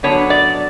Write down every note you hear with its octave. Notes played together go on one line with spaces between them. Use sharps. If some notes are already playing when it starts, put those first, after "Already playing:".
D3 F#3 B3 D4 C#5
D5